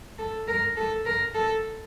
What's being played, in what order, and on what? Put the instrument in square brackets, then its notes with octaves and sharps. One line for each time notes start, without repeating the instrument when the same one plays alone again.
[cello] A4
A#4
A4
A#4
A4